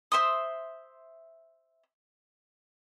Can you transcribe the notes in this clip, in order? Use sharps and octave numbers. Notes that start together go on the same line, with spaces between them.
C5 E5 C6 D#6